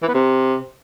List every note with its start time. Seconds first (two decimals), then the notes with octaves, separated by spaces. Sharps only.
0.03 E3
0.08 B3
0.14 C3